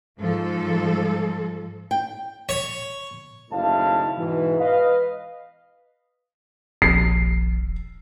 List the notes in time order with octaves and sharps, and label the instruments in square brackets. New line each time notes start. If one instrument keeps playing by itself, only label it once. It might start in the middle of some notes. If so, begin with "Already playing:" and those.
[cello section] G#2 F3 G#3 A4
[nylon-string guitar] G5
[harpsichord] C#5
[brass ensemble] F#1 D#2 A2 E4 F5 A5
G#2 B2 E3
B4 D#5 F5
[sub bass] D#1 [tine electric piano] A#1 [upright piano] C7